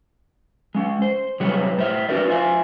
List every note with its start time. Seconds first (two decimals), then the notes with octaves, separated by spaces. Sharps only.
0.75 G#3 C#4
1.02 C5
1.40 C3 F#3 G3 G#4 B4 C#5
1.77 A2 C5 E5
2.09 C#4 D4 F#4 A#4 B4 D5
2.27 F4 C5 E5 G#5